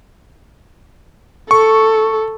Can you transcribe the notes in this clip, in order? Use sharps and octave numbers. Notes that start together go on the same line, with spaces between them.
A4 C#6